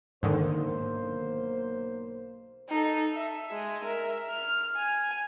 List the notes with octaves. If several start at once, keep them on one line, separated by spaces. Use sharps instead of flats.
B1 G#2 D3 D#3 A#3 C5
D#4 A4
E5
G#3
A#4 E5
F6
G#5